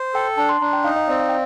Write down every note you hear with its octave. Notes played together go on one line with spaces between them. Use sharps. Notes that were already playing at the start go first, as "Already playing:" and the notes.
Already playing: C5
A4 G5
D4 A5
C6
D4 A#5
G5
D#4 F5
D#5
C4 D5
F5
G5